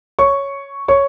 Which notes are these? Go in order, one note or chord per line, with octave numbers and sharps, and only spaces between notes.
C#5 C#6
C#5 C#6